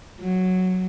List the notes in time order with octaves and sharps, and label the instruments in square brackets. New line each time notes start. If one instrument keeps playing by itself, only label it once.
[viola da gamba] F#3